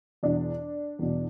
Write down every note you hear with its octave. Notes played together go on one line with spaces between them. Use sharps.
E2 B2 D4
E2 B2